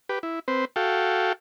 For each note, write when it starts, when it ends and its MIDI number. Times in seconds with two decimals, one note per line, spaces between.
0.09 0.19 67
0.09 0.19 71
0.23 0.39 64
0.48 0.65 60
0.48 0.65 71
0.48 0.65 72
0.76 1.33 66
0.76 1.33 69
0.76 1.33 77
0.76 1.33 79